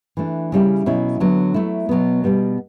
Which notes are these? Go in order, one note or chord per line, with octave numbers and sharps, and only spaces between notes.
E3 A3 D4
C#3 G3 C#4 E4
B2 F#3 C#4 E4
D3 F#3 B3
F#3 A3 E4
B2 F#3 B3
B2 G3 B3